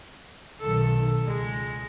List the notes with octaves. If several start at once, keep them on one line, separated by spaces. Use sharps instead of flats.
B1 D#3 A4
C#2 G#3